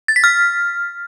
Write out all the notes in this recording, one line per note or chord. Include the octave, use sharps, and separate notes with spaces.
A6
B6
F6